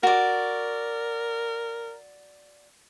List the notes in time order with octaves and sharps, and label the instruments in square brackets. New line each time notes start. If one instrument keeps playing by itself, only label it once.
[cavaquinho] F#4 D5 [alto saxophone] A#4